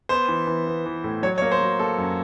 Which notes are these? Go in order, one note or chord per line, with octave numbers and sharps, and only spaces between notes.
B3 C5
E3
E3
B3
E3
A2
F#3 C#5
C#5
A#3
C5
F#3
A#3 A4
F#2